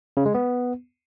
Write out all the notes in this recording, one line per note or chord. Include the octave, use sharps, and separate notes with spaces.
C#3
G#3
B3